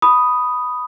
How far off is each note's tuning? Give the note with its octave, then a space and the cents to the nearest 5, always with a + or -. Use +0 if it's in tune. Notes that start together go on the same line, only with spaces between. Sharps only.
B5 +0 D#6 +0